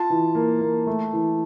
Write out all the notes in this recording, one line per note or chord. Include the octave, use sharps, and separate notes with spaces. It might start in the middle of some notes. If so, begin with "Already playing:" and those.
Already playing: F4 A5
E3
A#3
A#3
A3
E3